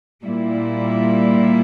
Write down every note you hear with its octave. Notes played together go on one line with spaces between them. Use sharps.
A#2 G3 A#3 E4